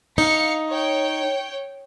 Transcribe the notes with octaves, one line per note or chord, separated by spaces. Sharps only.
D#4 F5 C#7
C#5 G5